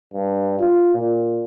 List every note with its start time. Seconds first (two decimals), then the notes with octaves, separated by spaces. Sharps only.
0.13 G2
0.59 F4
0.94 A#2